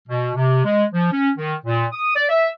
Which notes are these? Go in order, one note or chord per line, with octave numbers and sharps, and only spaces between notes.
B2
C3
G#3
F3
C#4
D#3
A#2
D#6
D5
E5